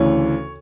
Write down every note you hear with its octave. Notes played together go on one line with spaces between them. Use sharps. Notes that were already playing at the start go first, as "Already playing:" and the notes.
Already playing: D2 C#3 E3 C#5